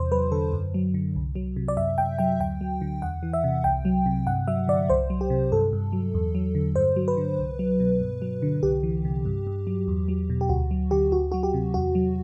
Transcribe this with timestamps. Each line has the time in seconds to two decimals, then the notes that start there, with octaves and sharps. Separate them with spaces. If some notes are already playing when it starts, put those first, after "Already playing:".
Already playing: E2 C3 C5
0.12 F#3 B4
0.32 D3 A4
0.53 F#2
0.74 F#3
0.94 D3
1.16 C2
1.35 F#3
1.56 C3
1.68 D5
1.77 F#2 E5
1.98 F#2 G5
2.19 F#3 G5
2.39 D2 G5
2.61 F#3
2.81 D3
3.02 E2 F#5
3.23 E3
3.33 E5
3.44 C3
3.64 C2 G5
3.85 F#3
4.06 C3
4.26 G2 F#5
4.47 F#3 E5
4.68 D3 D5
4.89 C2 C5
5.10 F#3
5.21 G4
5.30 C3
5.52 G2 A4
5.73 G2
5.92 F#3
6.14 E2
6.35 F#3
6.55 D3
6.76 G2 C5
6.96 F#3
7.08 B4
7.17 D3
7.39 C2
7.59 F#3
7.80 B2
8.01 G2
8.22 F#3
8.42 D3
8.63 C2 G4
8.83 E3
9.05 C3
9.25 G2
9.47 G2
9.67 F#3
9.88 E2
10.08 F#3
10.30 B2
10.41 G4
10.49 D2 F#4
10.71 F#3
10.91 D3 G4
11.12 D2 F#4
11.32 F#3 F#4
11.43 G4
11.54 C3
11.74 E2 F#4
11.95 F#3